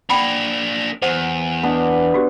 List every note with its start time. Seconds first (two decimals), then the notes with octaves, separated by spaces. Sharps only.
0.09 A#3 D4 F#5 G5 B5
1.02 E2 C5 F#5
1.63 B3 D4
2.14 F#4 G4